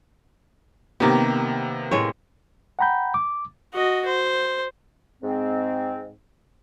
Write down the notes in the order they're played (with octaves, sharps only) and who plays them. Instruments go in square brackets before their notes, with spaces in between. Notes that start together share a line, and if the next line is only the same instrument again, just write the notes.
[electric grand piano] C3 A#3 B3 [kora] D#3 G4
[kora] A2 G#3 C#5
[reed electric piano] F#5 G5 A#5 B5 G6
D6
[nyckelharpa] F#4 D#5
C5
[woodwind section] G#2 C4